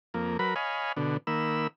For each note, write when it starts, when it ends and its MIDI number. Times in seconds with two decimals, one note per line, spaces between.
0.14 0.37 41
0.14 0.37 58
0.39 0.54 54
0.39 0.54 70
0.39 0.54 71
0.39 0.54 83
0.56 0.92 73
0.56 0.92 75
0.56 0.92 77
0.56 0.92 80
0.56 0.92 83
0.97 1.17 47
0.97 1.17 50
1.27 1.67 51
1.27 1.67 58
1.27 1.67 83
1.27 1.67 88